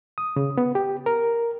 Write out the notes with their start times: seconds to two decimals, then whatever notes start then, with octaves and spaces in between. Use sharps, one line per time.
0.18 D#6
0.36 C#3
0.58 B3
0.75 G4
1.06 A#4